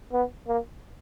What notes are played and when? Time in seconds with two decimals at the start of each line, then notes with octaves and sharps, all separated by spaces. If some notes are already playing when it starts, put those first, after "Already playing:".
0.13 B3
0.48 A#3